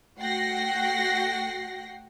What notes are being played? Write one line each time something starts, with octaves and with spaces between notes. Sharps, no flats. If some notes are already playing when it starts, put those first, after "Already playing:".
A3 F#4 F#5 G5 A#6 C7